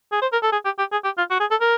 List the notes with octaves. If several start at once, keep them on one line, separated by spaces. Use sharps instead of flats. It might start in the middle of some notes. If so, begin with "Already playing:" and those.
G#4
C5
A#4
A4
G#4
G4
G4
G#4
G4
F4
F#4
G#4
A4
A#4